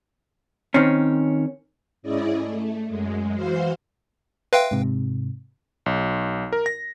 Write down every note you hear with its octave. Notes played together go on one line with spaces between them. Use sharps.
D#3 C4 C#4
G#2 C#4 E4 G#4 D5 D#5
A3
F#2 G#3
E3 F#4 C5 F5 C6
B4 E5 F5 G5 C6 A#6
G#2 C3
B1
A#4
A#6